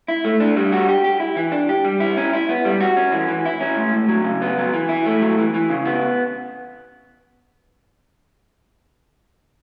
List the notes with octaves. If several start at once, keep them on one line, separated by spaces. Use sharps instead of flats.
E4
A3
D4
G3
F#4
G4
G4
E4
E3
D4
G4
G3
E4
C#4
E4
B3
G3
F#4
C#4
E3
E3
E4
C#4
A2
A2
F#3
C#3
B3
F#3
E3
E4
A3
F#3
E3
E3
C#3
B3